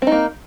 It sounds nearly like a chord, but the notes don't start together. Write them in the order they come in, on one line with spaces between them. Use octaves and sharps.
C4 D#4 A#3